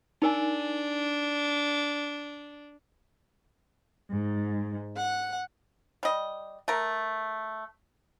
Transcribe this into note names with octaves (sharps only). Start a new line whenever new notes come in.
D4 D#4 A#4 G#5
G#2
F#5
G3 D#5
A3 A#4